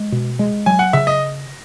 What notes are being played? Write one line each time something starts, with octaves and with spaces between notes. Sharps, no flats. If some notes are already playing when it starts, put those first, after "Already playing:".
Already playing: G#3
B2
G#3
F#3 G#5
F#5
C#3 E5
D#5